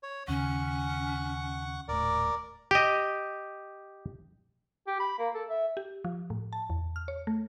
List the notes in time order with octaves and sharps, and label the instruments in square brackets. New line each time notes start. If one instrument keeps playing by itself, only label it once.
[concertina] C#5
[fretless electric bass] D#2 C#3 [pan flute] C#4 [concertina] F#5 C#6
[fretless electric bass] D#1 A2 [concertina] A#4 D5
[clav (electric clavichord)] G4 D#5
[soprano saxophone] G4
B5
A#3
A4
E5
[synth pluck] G4
F3
A2
A5
E2
F6
C#5
A3